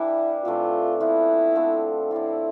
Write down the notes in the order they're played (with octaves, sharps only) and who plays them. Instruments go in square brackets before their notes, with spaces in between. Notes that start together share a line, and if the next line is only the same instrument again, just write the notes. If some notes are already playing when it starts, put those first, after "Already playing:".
Already playing: [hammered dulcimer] E3 G3 D4 G4 [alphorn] E4
[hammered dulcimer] C3 E3 A3 D4 [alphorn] F4
[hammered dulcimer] E3 B3 F4 B4 [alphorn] E4
[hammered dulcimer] D3 F3 A3 C4
[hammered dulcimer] A2 G3 C4 F4 [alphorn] E4